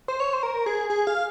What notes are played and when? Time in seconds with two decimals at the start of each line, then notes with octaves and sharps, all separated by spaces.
0.08 C5
0.20 C#5
0.33 C5
0.43 A#4
0.66 G#4
0.90 G#4
1.07 F5